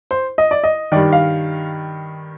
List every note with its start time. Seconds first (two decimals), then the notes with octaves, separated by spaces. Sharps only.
0.11 C5
0.38 D#5
0.51 D5
0.64 D#5
0.92 G2 D#3 D5
1.13 F5